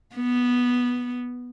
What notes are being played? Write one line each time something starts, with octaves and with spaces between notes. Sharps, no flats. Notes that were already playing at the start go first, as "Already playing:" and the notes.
B3